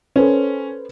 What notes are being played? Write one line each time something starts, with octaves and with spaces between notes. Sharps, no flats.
C#4 A4 B4 C5